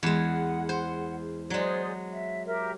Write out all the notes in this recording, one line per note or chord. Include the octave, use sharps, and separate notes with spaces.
E2 G#3 F#5
C5
F#3 G#3 G#4 C5 D5
E5
G4 A#4 E5